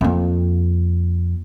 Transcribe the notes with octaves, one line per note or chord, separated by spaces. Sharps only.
F2 A#3